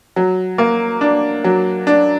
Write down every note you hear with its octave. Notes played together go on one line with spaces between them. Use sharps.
F#3
A#3
D4
F#3
D4